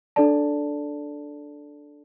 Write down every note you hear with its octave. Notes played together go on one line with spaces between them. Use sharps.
D4 A4 D5 A5